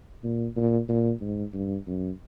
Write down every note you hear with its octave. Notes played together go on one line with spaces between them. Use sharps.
A#2
A#2
A#2
G#2
G2
F#2